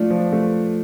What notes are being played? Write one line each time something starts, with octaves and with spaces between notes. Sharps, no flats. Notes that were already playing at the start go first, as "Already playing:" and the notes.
Already playing: F3 A3 D4 F4
F3
A3